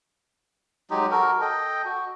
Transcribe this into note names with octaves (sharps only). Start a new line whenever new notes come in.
F#3 G#3 D#4 G4
F#4 A4 A#4
A4 D#5 G5
F#4